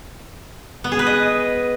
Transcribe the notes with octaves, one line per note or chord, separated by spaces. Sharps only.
B3
G#4
B4
D#5